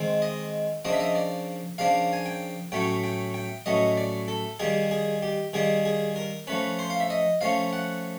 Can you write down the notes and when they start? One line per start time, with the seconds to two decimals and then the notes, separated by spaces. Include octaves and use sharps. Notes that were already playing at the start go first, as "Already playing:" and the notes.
Already playing: D#3 G#3 C4
0.22 D#5
0.85 C#3 F3 A#3 D4 D#5
0.93 E5
1.00 D#5
1.15 D5
1.78 C#3 F3 A#3 D4 F5
2.13 G#5
2.26 G5
2.72 A2 F#3 A3 C#4 G5
3.04 G5
3.34 G5
3.66 A2 F#3 A3 C#4 D#5
3.97 D5
4.28 A4
4.59 D#3 G3 A#3 D#4 G#4
4.91 G#4
5.23 G4
5.53 D#3 G3 A#3 D#4 G#4
5.85 G#4
6.16 A#4
6.47 F3 A3 C#4 B4
6.79 C5
6.90 F5
7.00 E5
7.10 D#5
7.41 F3 A3 C#4 F5
7.73 F#5